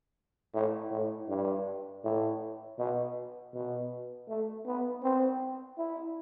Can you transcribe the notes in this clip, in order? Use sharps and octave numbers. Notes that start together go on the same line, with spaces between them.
A2
A2
G2
A2
B2
B2
A3
B3
C4
E4